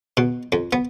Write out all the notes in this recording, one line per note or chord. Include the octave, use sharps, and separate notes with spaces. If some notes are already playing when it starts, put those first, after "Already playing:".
B2
F2
B3